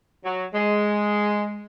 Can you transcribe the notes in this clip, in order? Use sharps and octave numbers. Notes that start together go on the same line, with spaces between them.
F#3
G#3